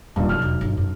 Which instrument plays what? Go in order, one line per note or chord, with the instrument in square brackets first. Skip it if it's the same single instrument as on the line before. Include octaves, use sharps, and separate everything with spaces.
[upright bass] D#1 [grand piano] G2 A#2 D#3
[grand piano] B1 F6 [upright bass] E3 B3
[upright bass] E1
G1
F#2